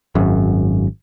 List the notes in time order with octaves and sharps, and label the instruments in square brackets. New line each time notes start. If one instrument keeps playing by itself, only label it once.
[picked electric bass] G#1 F#2